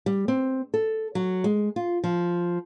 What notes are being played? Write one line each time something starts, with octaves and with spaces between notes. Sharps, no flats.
G3
C4
A4
F#3
G#3
F4
F3